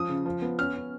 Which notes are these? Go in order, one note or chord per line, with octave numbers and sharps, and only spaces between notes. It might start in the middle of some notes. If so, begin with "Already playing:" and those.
Already playing: F3 D#6
C#3
F3
B3
C#4 F6
C#4